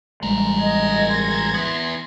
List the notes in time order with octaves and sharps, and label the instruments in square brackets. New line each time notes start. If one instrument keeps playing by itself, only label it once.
[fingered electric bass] A1 G3 G#3 [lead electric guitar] G#4 A#4
[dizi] D#5 [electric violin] G#6 A#6
[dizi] C6
[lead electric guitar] B3 E4